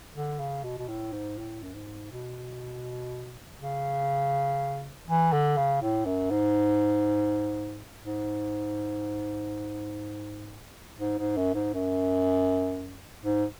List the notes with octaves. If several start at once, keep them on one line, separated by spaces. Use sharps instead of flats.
D3
C#3
B2
B2
A2
G#2
A2
F#2
G#2
B2
C#3
E3
D3
C#3
A2
F#2
G#2
G#2
G#2
G#2
F#2
G#2
F#2
G#2